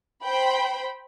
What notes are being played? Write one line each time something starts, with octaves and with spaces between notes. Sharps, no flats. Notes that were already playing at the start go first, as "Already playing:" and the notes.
C5 G5 B5